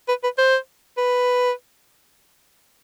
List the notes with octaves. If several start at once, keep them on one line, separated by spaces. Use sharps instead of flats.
B4
B4
C5
B4